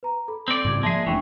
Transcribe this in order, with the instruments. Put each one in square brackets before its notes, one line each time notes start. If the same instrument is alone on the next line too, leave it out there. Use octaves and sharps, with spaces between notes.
[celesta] B4 A#5
A4 B5
[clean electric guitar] C4 D5 [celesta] A#6
[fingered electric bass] G#2 C#3 G3 [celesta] D6 G#6
[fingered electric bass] F3 A#3 [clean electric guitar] G#3 G#4 [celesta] D5 E5 A5
[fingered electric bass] F1 A3 D4 [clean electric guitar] E3 [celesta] G5 G#5 C#6